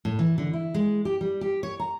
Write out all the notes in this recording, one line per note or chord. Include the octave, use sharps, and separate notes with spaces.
A2
E3
D3
E4
G#3
G4
G3
G4
C#5
A#5